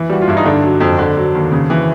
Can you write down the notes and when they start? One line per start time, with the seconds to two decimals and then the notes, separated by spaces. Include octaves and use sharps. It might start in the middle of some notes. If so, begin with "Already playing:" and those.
Already playing: E3
0.09 G3 F#4
0.22 F4
0.28 G2 E4
0.37 D#4
0.45 D3 D4
0.63 F#3
0.80 F2
0.98 D3
1.16 F#3
1.35 D#2
1.52 C#3
1.70 E3